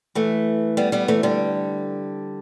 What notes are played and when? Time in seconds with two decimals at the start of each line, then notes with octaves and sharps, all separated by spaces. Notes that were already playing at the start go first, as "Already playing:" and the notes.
0.15 E3 A3
0.77 G3 B3
0.92 G3 B3
1.08 E3 A3
1.23 D3 G3